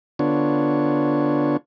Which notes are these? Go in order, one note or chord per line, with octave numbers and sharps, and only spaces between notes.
D3 B3 D4 F4 C#5